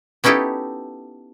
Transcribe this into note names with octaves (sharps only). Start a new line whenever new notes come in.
B3 C#4 D#4 E4 G4 A4